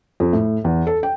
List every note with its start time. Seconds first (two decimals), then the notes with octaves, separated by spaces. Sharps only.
0.20 F2
0.33 A2
0.64 E2
0.87 A4
1.03 G5